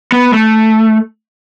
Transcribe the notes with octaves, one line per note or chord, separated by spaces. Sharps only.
B3
A3